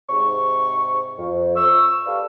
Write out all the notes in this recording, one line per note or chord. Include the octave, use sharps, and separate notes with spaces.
G#2 C3 C#6
F2
C#6 E6
G4 A4 B4 D5 F5